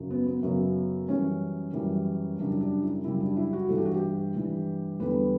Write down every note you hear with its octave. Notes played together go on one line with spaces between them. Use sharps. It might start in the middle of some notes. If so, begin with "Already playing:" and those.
Already playing: F#2 C#3 F#3
B3
B3
F#2 C#3 F#3 B3
F#2 E3 G3 C#4
F#2 E3 G3
F#2 C#3 G3 D4
D4
E4
F#2 C#3 G3 E4
D4
E4
F#4
G2 E3 G3 A4
G4
F#4
G4
G2 E3 G3
E2 D3 G3 B4